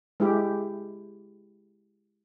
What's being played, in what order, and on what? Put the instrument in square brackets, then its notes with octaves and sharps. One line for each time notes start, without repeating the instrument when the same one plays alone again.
[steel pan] G#3 E4 G4